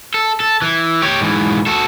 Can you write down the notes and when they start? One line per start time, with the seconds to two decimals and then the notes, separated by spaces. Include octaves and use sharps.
0.14 A4
0.40 A4
0.62 E3
1.02 G4 C#5
1.21 G#2 E3
1.66 F#4 A4